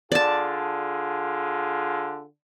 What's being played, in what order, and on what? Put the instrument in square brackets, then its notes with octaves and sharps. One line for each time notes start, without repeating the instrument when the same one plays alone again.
[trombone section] D3 F4 G#4 [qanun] D5 A5